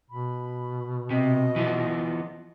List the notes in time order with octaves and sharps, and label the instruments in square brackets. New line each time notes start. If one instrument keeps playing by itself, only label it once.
[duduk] B2 [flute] B5
[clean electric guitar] C3 [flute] D#5
[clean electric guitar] E3 F3 B3